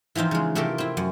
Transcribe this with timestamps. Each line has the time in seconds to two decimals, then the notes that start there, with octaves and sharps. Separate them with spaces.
0.15 E3 F3 C4 D#4 F4
0.31 C#3 G#3
0.55 C3 A3 C4 F4 G4 A#4
0.78 C4 E4
0.97 F#2